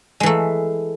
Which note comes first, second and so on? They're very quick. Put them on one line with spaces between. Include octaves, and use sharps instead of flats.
G#3 E3 A3